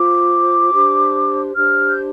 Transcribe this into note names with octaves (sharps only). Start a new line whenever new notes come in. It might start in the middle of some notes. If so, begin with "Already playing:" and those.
Already playing: F4 C5 D6
D4 G4 C5
D4 G4 C5 F6
G6